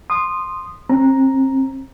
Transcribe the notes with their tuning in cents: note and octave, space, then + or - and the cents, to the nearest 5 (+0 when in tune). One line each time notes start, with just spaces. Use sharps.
C6 +0 D#6 -20
C4 +35 A#5 +0